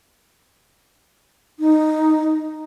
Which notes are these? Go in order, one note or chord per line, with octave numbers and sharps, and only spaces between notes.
D#4